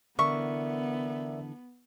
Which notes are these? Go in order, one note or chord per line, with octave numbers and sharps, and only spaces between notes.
D3 E3 B3 A#4 D5 E5 C#6